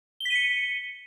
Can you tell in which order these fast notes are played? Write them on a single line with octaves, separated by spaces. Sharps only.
G7 B6 D#7 C#7